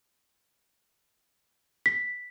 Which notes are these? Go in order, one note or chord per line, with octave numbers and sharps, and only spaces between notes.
B6